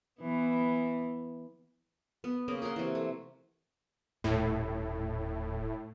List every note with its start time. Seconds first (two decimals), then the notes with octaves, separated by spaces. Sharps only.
0.21 E3 B3
2.24 B3
2.48 C#3 A#3 D#5
2.62 A#4 C#5 F#5 C6
2.76 C3 E3
2.95 A3
4.24 D#1 A2